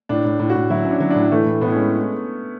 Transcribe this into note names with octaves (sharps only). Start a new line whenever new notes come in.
A2 D4
A2
A2
F#4
A2
F#3 E4
C#4
D4
F#3
A2 D4
E3 A3
A2
A2 B3
G#3 C#4